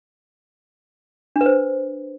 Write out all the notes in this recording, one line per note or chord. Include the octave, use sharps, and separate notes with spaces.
D4
B4
C5